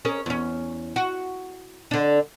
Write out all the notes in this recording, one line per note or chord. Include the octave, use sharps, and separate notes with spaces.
C#4 G#4 A#4
E2 C#4
F#4
D3 D4